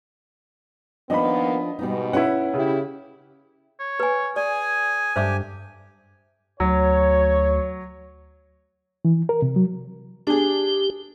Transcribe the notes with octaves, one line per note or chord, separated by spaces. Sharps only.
D#3 F3 A#3 B3 D4 F4 D#5 B5
G#2 B2 G3 B3 D#4
C#4 E4 B4 F#5
C#3 E4 G4
C#5
B4 G#5
G#4 D5 G#5
G2 G4 C5 E5 D6
D2 F#3 C#5
E3
A#4
C3
F#3
D4 G4 G#4